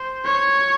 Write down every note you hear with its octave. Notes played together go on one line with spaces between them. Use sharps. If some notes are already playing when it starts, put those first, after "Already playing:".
Already playing: C5
C#5